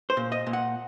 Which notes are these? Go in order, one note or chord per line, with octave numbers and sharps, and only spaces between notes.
C5
A#2
D#5
A#2
F#5